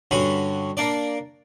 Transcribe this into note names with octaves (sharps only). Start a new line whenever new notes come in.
G2 D3 C#4 F#4 B5
A#3 D4 D5